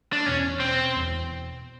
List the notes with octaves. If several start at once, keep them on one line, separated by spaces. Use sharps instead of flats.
D4
E1 E2 B2 C#4
C4
E1 E2 B2